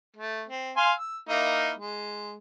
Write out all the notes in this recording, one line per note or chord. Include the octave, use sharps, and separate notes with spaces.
A3
C4
F5 G#5 C6
E6
A#3 D#4 E4
G#3